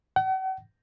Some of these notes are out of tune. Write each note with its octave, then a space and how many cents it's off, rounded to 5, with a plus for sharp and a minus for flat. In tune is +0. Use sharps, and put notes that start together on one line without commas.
F#5 +45